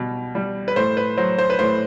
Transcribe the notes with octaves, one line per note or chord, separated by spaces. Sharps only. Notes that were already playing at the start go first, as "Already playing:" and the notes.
Already playing: B2 G3
G3
B4
A2 C5
B4
F#3 C5
C5
B4
A2 C5